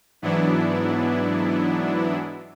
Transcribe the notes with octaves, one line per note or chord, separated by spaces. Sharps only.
G#2 E3 F#3 B3 D4 E4